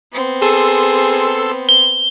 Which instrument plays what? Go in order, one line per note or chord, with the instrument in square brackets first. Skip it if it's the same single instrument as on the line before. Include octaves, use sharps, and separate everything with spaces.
[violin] B3 C4
[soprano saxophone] G#4 [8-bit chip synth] A4 C6 E6
[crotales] G7